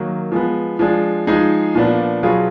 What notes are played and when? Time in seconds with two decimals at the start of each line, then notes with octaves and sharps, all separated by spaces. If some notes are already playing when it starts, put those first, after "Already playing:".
Already playing: D#3 F#3 A#3
0.32 F3 G#3 B3
0.79 F3 G#3 D4
1.27 F3 G#3 D#4 G#4
1.75 A#2 F3 B3 D4
2.23 B2 F#3 B3 F4 G#4